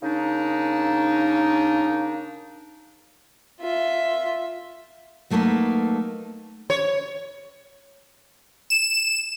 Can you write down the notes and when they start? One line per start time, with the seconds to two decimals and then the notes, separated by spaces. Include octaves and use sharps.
0.02 C#3 A#3 D4 D#4
3.61 F4 E5
5.30 F#3 A3 A#3 D#4 A4 B4
6.70 C#5
8.70 E7